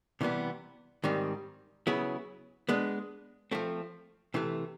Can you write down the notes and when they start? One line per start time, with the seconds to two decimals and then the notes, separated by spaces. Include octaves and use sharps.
0.21 C3 E3 G3 B3
1.04 G#2 D#3 G3 C4
1.87 C#3 F#3 B3 E4 G#4
2.69 G#3 B3 D4
3.51 F3 A3 C4
4.34 C3 E3 A3